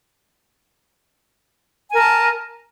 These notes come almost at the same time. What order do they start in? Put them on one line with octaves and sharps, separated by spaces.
G#5 A#4 A5